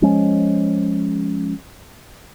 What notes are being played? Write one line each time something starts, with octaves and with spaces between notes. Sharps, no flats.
F3 G#3 C#4